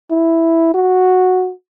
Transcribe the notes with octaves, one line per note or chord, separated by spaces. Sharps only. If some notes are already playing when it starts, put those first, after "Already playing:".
E4
F#4